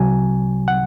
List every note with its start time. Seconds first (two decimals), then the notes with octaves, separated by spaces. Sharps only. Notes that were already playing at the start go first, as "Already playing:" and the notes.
Already playing: C2 C3 F#3 G#5
0.68 F#5